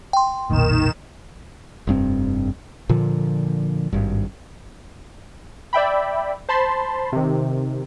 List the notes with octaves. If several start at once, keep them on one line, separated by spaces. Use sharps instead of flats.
G5 C6
F1 B1 A#2 D#3 E7
F1 G2 C4
A#2 D3 F3
G#1 G2
D5 E5 G5 B5
C5 A5 B5 C6
C3 D#3